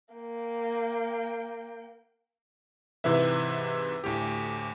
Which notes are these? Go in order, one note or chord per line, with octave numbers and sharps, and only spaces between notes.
A#3 G5
G#2 C3 E3 B4 E5
D2 A2 G4